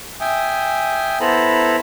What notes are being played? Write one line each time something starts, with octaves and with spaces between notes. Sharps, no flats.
E5 G5 G#5 D#6
B3 E4 A4 C5 A#5 B5